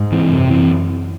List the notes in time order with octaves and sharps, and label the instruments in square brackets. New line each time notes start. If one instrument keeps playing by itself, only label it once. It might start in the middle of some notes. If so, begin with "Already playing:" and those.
Already playing: [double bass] G#2
[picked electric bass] E3 C4
[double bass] F#2 [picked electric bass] C3
[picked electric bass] E3 C4